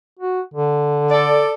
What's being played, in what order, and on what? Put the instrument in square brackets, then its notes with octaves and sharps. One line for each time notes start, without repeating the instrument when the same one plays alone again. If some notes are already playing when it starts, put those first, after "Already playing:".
[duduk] F#4
D3
[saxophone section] A4 D5